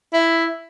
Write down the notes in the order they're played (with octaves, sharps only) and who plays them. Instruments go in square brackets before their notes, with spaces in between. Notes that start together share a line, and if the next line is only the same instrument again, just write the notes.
[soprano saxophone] E4